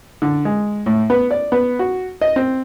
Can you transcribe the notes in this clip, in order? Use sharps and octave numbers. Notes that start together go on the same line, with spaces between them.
D3
G#3
A2
B3
D5
B3
F#4
D#5
C4